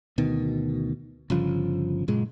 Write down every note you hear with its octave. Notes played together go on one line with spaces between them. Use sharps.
D2 B2 D#3
G1 C#3 F3
F#1 A#2 G#3